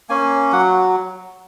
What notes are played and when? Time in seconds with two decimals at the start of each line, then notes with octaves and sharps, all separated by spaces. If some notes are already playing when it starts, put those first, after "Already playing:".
0.09 A#3 C#4 G#5
0.52 F#3 F#5